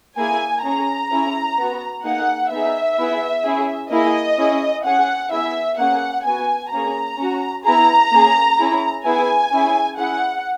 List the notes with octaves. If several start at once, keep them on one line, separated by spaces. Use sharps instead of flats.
A#3 E4 G#4 G#5
C#4 G#4 A#5
C#4 E4 G#4
B3 F#4
A#3 D#4 G#4 F#5
B3 D#4 G#4 E5
B3 E4 G#4
C#4 E4 G#4
A#3 E4 G#4 D#5
C#4 E4 G#4
C#4 G#4 F#5
B3 E4 G#4 E5
A#3 C#4 G#4 F#5
B3 F#4 G#5
A#3 C#4 G#4 A#5
C#4 F#4
B3 E4 G#4 A#5
A#3 C#4 G#4
C#4 E4 G#4
B3 E4 G#4 G#5
C#4 E4 G#4
C#4 E4 G#4 F#5